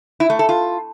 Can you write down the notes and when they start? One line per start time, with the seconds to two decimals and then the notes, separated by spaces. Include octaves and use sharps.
0.20 E4
0.30 A3
0.39 A4
0.49 F4